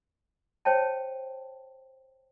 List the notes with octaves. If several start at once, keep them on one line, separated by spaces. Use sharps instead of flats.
C5 C#5 G5 A5